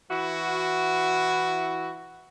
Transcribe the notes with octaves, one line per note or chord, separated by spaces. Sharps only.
E3 E4 F#4